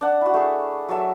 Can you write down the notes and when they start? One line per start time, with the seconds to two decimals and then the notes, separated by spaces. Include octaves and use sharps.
0.01 D4 F#5
0.21 E4 F#4
0.34 A3 G#4
0.89 F#3 F#4 A4 E5